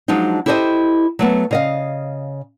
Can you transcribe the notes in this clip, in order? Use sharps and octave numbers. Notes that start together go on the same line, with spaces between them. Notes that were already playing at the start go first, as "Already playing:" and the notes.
F3 F#3 G#3 D4 D#4
E4 G4 A4 C5 D5 D#5
F#3 A3 B3
C#3 D#5 F5